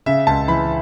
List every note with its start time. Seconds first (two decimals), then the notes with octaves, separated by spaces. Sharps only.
0.06 C#3 E5
0.27 C#2 A5
0.48 E3 B5